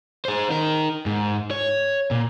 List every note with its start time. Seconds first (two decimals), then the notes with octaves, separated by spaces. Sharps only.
0.25 G#4 C5
0.50 D#4 A#4
1.06 G#2
1.51 C#5
2.11 A#2